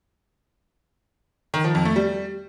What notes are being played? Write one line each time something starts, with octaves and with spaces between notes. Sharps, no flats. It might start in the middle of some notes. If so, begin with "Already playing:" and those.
D#3
F3
F2
A3
G3